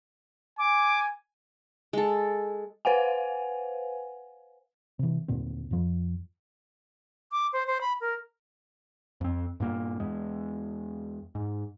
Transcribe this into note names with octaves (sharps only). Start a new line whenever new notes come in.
G#5 D6
G#3 A4
B4 C5 F5 F#5 G#5
C3 E3
D#2 A#2 D3 C4
F2 F3
D6
C5
C5
B5
A#4
F2 C4
G2 A#2 A#3
E2 G#3
G#2